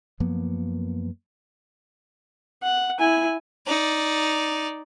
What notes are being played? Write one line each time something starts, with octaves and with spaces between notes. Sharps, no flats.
F#2 F3 A#3 B3
F#5
E4 G#5
D#4 D5